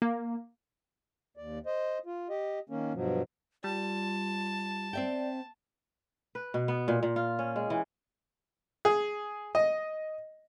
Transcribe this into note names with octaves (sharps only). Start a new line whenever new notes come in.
A#3
D#2 D5
C5 D#5
F4
G4 D#5
D#3 A#3 C#4
G2 B2 F3 F#3
G3 F4 A5
C4 D5 E5 G5
B4
B2
B3
A#2
A#2
F4
C#4
G#3
E3
G#4
D#5